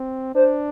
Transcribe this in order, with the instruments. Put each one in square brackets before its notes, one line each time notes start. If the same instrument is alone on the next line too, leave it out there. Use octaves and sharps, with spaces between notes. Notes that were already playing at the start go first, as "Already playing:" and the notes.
Already playing: [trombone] C4
[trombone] D4 [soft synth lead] C5